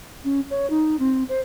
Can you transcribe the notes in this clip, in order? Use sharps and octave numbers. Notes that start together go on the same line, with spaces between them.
C#4
C#5
D#4
C4
C5